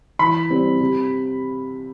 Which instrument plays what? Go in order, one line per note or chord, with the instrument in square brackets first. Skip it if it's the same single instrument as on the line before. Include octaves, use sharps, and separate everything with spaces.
[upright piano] E3 [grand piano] B5
[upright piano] G3 C4
C3